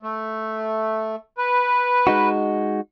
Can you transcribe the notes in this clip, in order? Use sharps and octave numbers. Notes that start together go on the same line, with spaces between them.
A3
B4
G#3 D#4 F#4